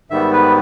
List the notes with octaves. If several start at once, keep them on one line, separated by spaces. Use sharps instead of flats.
G#2 D#3 G3 B3 E5
B4